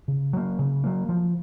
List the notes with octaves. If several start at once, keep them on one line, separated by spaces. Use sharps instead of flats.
C#3
F#3 A#3
C#3
F#3 A#3
F3